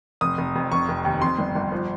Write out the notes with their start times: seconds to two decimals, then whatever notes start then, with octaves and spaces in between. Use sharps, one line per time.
0.21 F1 D#6
0.38 F1
0.55 F2
0.72 F1 C#6
0.88 F1
1.05 D#2
1.22 F2 C6
1.39 G1
1.55 G1
1.72 F3